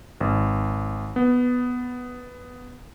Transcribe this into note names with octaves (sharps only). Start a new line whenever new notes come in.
G#1
B3